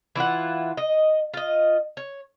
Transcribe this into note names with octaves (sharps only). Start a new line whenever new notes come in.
E3 E4 F4 F#5
D#5
F4 D#5
C#5